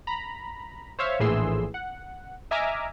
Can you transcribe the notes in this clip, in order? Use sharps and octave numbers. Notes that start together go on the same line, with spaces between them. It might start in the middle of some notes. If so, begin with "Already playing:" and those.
A#5 B5
C5 C#5 E5 F5
A#1 A2 E3 G#4 C6 E6
F#5
D#5 E5 G#5 A#5 D6 F6